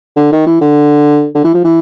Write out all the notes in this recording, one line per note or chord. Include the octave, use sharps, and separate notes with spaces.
D3
D#3
E3
D3
D3
E3
F3
E3